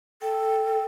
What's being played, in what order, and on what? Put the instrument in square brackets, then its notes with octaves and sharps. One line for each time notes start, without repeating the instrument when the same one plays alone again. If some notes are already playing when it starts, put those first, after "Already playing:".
[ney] A4 [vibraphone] G5